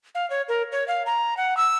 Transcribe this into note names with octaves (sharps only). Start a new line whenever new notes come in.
F5
C#5
A#4
C#5
F5
A#5
F#5
E6